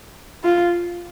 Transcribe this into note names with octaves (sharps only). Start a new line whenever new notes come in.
F4